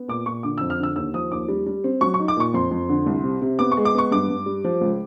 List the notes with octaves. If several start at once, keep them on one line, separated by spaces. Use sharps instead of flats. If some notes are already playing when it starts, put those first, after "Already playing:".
Already playing: B3
A#2 D6
A#2 C#6
D3 D6
F2 E6
F6
D3 E6
D#2 E6
F3 D#6
D#2 D6
G3
G3
C4
F#3 C#6
C#6
D#4
D6
A#2 C#6
F2 C6
F2
D3
C2
C3
C3
B3 D6
C#6
G#3
D6
B3 C#6
G2 D6
G2
G3
F3
C#2